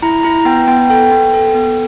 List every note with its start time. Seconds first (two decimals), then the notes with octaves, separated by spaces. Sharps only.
0.02 E4 A#5
0.23 E4 A#5
0.45 B3 G5
0.67 B3 G5
0.90 A4 G5
1.11 B3
1.34 A4
1.55 B3